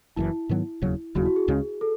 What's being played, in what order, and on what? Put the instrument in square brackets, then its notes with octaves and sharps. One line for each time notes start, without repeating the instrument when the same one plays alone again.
[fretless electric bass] F#1 F#2 E3 [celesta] E4
[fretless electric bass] G#2 D#3 F#3 B3
E1 D#2 C#3 F#3
[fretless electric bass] E1 D#2 C#3 F#3 [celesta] F#4
[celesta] E4
F#4
G#4
[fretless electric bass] C#2 C#3 G#3 C#4
[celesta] A4